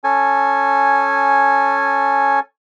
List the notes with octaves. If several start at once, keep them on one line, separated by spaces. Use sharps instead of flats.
C#4 A4 G#5